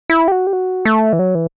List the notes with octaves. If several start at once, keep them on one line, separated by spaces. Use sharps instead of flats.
E4
G4
F#4
G4
F#4
A3
E3
F#3
E3